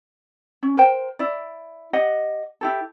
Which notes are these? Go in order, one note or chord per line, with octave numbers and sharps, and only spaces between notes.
C#4
A#4 C5 G5
E4 D5
G4 D#5 F#5
E4 G4 A4